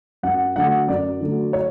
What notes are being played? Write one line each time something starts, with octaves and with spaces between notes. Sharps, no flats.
F#2 F#5
D3 F#3 A3 F#5
F#2 D5
D3 F#3 A3
C#5